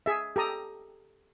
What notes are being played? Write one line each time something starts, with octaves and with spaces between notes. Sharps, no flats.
G#4 E5
G4 A4 A#5 D#6